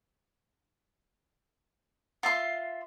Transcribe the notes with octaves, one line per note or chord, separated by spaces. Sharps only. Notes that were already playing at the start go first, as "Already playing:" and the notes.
F4 E5 C6